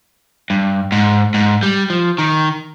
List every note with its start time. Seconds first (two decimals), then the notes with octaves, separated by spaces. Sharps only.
0.50 G2
0.92 G#2
1.34 G#2
1.63 G3
1.90 F3
2.18 D#3